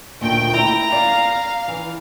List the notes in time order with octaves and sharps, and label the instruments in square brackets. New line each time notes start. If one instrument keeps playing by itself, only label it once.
[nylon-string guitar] D2 A#2 D#3 [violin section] G5
[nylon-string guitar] E4 [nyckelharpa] A#5
[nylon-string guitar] D5 [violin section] F5
[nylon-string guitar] E3